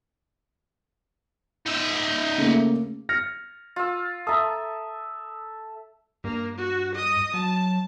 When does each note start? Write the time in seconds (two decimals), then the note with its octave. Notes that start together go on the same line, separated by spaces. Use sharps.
1.66 D#4 E5
2.38 C#3 A3 A#3
3.09 F6 A#6 C#7
3.76 F4 E6
4.27 A4 E5 A#5 D#6
6.24 G2 A#3
6.58 F#4
6.95 D#5 D#6
7.34 F#3 A5